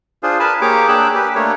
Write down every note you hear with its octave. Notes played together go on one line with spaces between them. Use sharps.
D4 F4 G#4 C5
A#4 B4 G#5 A5 B5
A#3 G4 G#4 C#5 D6
A#3 D4 G#4 G5 E6 F#6
G4 B4
A3 A#3 D4 C#5